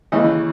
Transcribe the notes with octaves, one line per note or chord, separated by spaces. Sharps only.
D#2 C#3 E3 D#5